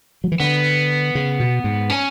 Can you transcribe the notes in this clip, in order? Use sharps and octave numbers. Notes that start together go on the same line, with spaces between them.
F#3
E3
D3 B3
C#3
B2
G#2
C#4